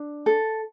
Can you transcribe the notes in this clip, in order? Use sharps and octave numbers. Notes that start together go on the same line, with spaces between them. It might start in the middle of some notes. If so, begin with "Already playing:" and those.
Already playing: D4
A4